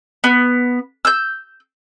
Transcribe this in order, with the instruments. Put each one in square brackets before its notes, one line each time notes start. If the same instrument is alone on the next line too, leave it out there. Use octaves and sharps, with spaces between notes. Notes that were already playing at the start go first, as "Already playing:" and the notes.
[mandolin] B3
E6 G6